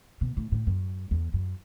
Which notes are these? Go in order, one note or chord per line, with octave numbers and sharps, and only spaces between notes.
B2
A2
A2
F#2
E2
F#2